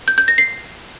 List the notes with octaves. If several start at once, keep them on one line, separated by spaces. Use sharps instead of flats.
G6
G6
A#6
C7